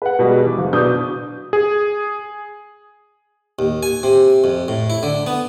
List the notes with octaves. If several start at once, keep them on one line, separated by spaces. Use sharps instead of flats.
B4 F#5
B2 G3 G#3
E3 D6
F#1
B2 D4 D#6 G6
G#4
D#2
G#5
C3
F2
A2
E4
D3
B3